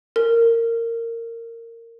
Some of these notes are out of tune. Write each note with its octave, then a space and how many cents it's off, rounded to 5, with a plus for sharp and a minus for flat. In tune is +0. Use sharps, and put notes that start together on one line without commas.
A#4 -20